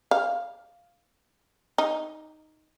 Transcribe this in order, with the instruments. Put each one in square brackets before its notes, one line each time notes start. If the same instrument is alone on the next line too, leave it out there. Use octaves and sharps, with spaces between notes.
[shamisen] F5
D#4